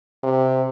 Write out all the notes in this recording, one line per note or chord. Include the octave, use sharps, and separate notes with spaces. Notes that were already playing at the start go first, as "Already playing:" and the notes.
C3